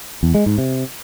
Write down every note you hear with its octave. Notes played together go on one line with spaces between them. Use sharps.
E2
G#3
G#2
C3